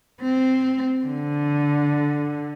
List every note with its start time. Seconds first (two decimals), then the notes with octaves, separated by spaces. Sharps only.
0.21 C4
1.06 D3